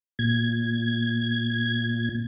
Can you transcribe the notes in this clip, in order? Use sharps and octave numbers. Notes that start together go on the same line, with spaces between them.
A#2 G#6